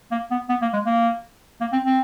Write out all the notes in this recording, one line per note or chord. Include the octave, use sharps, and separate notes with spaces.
A#3
B3
B3
A#3
G#3
A#3
A#3
C4
C4